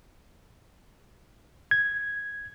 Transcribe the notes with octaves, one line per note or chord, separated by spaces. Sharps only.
G#6